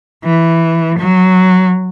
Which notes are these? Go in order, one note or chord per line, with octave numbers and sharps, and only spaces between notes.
E3
F#3